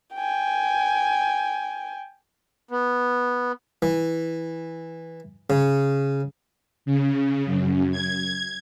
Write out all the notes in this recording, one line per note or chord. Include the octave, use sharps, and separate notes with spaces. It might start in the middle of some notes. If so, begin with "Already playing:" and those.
G5 G#5
B3
E3
C#3
C#3
F#2
G#6